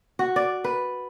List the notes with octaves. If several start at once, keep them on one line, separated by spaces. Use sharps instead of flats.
F#4
D5
B4